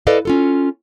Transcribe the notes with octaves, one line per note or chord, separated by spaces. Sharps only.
E4 A4 B4 D5 D#5 F5
C#4 F4 A4